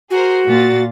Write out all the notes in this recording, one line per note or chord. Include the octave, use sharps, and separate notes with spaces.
F#4 G#4 A#4 C5
A#2 F4 A6